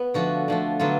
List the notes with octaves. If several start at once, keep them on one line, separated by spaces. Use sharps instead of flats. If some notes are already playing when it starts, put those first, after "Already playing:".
Already playing: B3
D3 F3 A3 F#4
D3 F3 A3
D3 F#3 B3 F4